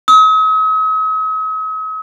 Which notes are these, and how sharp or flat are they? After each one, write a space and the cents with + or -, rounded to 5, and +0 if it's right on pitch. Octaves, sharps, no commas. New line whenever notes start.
D#6 +45